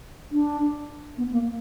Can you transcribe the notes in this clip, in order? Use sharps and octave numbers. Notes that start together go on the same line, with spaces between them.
D4
B3
A#3